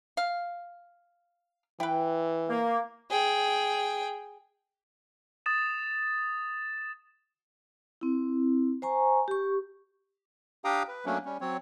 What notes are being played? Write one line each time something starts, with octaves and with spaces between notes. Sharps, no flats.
F5
E3 E4 B4 G5
A#3
G#4 G5
D#6 A6 E7
C4 E4
C5 G#5 A#5 C#6
G4 C#6
D4 G4 F5 G5 A#5 D#6
B4
F#3 A3 A#3 C#4 D4
G3 C#4
F#3 C4 C#5